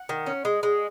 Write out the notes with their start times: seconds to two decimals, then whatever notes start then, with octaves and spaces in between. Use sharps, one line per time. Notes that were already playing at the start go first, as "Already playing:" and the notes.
Already playing: F#5
0.09 D#3
0.27 C#4
0.45 G#3
0.63 G#3